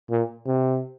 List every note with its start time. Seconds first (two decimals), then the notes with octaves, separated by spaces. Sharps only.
0.10 A#2
0.46 C3